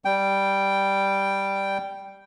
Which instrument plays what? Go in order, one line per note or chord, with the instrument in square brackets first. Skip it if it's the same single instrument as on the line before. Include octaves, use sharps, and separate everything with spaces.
[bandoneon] G3 G5